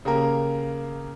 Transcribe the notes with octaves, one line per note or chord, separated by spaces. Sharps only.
C#3 A#3 G4 A#4